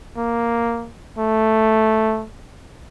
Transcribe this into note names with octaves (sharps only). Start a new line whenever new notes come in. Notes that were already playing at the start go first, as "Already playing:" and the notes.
A#3
A3